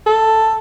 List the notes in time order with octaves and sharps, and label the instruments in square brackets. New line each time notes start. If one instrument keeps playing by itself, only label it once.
[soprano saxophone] A4